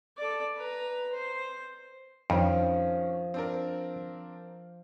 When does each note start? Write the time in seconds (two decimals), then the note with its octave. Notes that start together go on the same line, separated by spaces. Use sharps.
0.17 A4 D5
0.56 B4 A#5
1.13 C5
2.30 F2 D#3 F3 C#4 D4
3.34 C4 D4 A#4